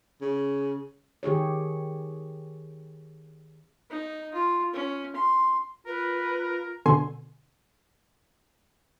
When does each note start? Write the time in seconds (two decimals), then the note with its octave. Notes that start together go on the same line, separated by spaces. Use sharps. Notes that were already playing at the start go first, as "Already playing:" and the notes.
0.22 C#3
1.23 D#3 G4 G#4 C#5
3.90 D#4
4.34 F4
4.73 C#4
5.16 C6
5.87 F4 A#4 B4
6.86 B2 D3 G#5 C6